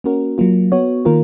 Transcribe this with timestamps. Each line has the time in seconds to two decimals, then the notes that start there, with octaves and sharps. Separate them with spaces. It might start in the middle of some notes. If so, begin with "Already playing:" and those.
0.04 A#3 C#4 F#4 A#4
0.38 F#3 A#3 F4
0.72 B3 F#4 C#5
1.05 D#3 A#3 F4 A#4